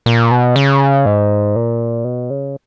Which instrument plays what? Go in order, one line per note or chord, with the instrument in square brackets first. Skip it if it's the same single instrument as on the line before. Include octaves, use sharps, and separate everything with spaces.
[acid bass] A#2
B2
C#3
G#2
A#2
B2
C#3